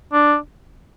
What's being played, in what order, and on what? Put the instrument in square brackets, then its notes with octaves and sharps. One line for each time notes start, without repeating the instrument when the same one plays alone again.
[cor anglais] D4